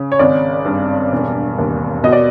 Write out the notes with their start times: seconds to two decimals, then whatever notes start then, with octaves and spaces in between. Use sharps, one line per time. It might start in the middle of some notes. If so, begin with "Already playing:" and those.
Already playing: C#3
0.12 C#5
0.19 G#1 D5
0.65 G2
1.12 E1
1.58 D#2
2.04 B2 D#5
2.12 D5